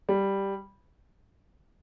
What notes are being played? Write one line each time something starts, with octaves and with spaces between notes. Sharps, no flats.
G3